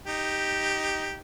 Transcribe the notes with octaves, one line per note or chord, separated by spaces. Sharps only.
D#4 G4